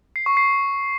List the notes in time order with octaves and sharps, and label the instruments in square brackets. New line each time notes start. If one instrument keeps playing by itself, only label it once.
[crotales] C7
C#6
C7